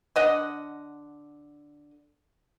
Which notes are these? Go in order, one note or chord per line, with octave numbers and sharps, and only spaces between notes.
D3 D#5 F#5